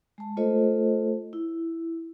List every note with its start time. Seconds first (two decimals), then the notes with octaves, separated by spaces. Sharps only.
0.18 G#3 A5
0.37 A3 F4 A4 C5 D#5
1.33 E4